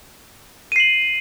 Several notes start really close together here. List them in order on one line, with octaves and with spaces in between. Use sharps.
D#7 C7 F#7